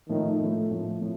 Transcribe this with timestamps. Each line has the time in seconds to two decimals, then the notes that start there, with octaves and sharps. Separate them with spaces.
0.09 A2 D#3 F3 A3
0.40 A2 F3 A3
0.71 A2 F3 A3
1.01 A2 F3